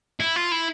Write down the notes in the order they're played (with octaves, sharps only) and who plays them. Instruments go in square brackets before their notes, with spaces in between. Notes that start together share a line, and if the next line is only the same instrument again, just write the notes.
[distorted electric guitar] E4
F4
E4